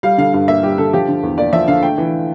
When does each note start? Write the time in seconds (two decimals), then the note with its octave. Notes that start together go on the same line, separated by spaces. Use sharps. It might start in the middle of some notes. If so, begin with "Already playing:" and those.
0.03 G3 F5
0.18 D3 F5
0.33 G2 F5
0.48 A#3 E5
0.63 G3 G4
0.78 D3 A4
0.93 F3 G4
1.08 D3
1.23 E2
1.38 A#3 D5
1.53 F3 E5
1.68 D3 F5
1.83 A3 G5
1.98 E3